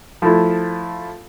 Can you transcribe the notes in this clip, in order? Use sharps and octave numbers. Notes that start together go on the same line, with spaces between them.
F3 A3 E4